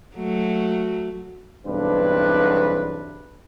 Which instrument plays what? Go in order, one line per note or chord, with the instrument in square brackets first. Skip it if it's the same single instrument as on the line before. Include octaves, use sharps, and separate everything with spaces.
[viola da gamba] F#3 A3
[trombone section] B1 E2 G2 C4 D4 B4